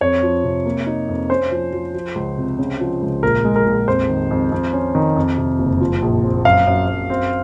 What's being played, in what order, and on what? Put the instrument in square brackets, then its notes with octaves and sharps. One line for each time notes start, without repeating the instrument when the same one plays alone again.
[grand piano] F2 C#5
F3
C3
A#3
D#4
F2
C#4 C5
F3
F3
F3
C#2
C3
C#3
F3
C#2
A#1 A#4
G#3
A#4
A#1
F2 C5
D#3
F2
F2
C#4
D#3
F2
C3
F#1
F3
A#1
C4
F#2 F5
F#2
F#2
C4